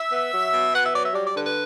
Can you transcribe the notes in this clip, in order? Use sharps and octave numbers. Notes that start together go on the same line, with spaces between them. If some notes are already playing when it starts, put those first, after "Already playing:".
Already playing: E5
B3
F#3
B2
B3 F#5
E5
F#3 D5
E5
G3 D5
D5
D3 B4
B4